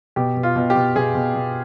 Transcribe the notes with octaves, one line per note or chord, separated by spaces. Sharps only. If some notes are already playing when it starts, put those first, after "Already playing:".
B2 G4
B2
F4
B2
G4
B2
B2 G#4
B2
B2